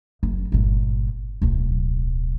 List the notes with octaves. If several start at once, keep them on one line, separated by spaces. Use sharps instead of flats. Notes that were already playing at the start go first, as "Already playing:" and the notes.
F#1
G1 A#2
D1 B1